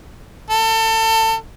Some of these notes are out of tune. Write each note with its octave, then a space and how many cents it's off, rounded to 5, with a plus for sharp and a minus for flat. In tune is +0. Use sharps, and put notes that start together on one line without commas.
A4 +30